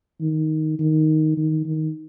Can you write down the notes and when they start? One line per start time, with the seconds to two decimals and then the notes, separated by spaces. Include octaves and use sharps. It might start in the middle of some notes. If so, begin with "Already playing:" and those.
0.21 D#3
0.79 D#3
1.37 D#3
1.66 D#3